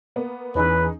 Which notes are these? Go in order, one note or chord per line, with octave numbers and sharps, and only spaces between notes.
A#3 B3
E2 E3 C#4 D#4 G#4 B4